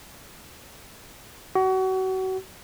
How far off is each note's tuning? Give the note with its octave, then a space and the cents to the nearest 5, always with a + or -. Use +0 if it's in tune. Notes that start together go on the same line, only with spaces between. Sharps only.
F#4 +30